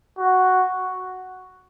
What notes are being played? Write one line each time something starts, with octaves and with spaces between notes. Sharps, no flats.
F#4